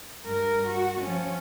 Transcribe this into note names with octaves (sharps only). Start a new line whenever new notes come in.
G2 A#4
F#4
F3 C#4